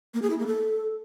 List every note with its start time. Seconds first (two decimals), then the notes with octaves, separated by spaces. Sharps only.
0.14 A#3
0.22 G#4
0.30 E4
0.39 A#3
0.47 A4